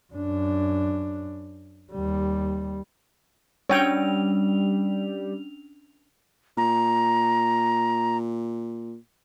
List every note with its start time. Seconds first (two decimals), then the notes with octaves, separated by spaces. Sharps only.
0.13 F#2 D4
1.92 D#2 G3
3.70 G3 C#4 D4 C#5 G5 F7
6.57 A#2 A#5